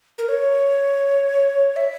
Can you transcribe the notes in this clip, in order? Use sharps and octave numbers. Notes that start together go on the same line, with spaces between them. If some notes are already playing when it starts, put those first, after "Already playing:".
A#4
C#5
E5